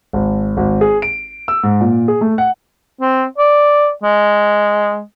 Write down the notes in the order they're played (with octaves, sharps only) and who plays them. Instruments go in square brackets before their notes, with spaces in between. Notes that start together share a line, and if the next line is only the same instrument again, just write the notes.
[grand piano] G#1
G#1
G#4
D7
E6
G#2
A#2
G#4
A3
F#5
[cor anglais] C4
D5
G#3